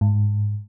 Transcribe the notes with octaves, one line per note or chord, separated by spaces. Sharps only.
G#2